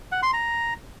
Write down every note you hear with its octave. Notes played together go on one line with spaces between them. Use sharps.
F#5
C6
A#5